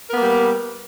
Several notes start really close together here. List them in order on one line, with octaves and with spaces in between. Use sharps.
A#4 B3 A#3 G3